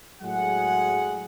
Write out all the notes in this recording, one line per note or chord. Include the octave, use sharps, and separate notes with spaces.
A2 F#3 G#3 G#4 F#5